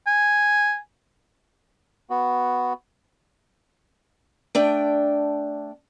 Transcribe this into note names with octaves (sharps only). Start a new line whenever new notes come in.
G#5
B3 F#4
A3 D4 G5